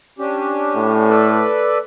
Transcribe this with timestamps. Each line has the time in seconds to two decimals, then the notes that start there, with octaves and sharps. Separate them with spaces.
0.19 C#4 D4 G4
0.75 A2
1.09 A4 B4 D5